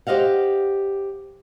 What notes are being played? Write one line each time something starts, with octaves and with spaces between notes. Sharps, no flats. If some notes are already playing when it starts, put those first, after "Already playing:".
G4 C5 D#5 F5 F#5